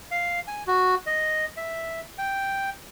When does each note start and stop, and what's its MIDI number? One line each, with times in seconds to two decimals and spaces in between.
0.11 0.40 77
0.47 0.63 80
0.67 0.95 66
1.06 1.45 75
1.57 2.01 76
2.18 2.70 79